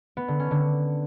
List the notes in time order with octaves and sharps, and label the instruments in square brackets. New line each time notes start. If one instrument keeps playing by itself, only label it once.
[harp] B3
D3
C#4
D3